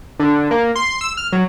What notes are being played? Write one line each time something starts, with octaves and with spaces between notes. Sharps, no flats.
D3
A#3
C6
E6
F6
F#3